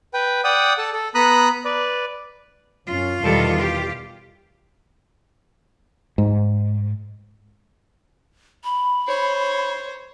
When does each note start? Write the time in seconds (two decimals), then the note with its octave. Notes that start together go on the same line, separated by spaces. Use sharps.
0.14 B4 G5
0.44 D5 F#5 G5 D#6
0.78 A4 A5
0.93 A4
1.15 B3 A#5 B5 D#6 F#6
1.65 B4 D5
2.87 F#2 C#4 F4 F5
3.22 E2 B2 D#3 G3 A4
3.56 G4
6.18 G#2
8.64 B5
9.07 C5 C#5